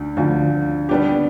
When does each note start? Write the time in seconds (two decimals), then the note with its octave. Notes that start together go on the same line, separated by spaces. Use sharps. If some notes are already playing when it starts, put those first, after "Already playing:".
Already playing: D2 D3
0.17 D2 D3 F3
0.89 G3 B3 D4 G4